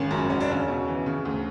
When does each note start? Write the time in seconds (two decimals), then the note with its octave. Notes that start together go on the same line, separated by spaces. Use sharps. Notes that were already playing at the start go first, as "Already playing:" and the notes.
Already playing: G#1 C#3 C#4
0.11 F#2
0.30 E1 C#4
0.40 D4
0.49 E1 C#3 C#4
0.68 B2
0.88 E3
1.06 C#3
1.25 D2